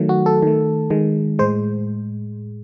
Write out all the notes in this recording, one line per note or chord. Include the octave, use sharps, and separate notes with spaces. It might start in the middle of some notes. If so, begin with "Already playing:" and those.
Already playing: D#3 F#3 A3
F#4
A4
D#3 A3
D#3 G#3
A2 G#3 C5